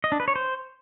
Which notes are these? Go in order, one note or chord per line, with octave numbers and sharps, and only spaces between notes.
D#5
D4
B4
C#5
C5